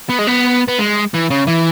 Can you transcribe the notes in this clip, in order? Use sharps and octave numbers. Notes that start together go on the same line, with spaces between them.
B3
G#3
B3
B3
G#3
E3
C#3
E3